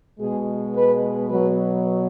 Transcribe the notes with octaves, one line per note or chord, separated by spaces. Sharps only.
B2 G#3 G#4
B4
B2 F#3 B4